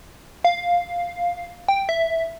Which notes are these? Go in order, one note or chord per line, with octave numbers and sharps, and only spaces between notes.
F5
G5
E5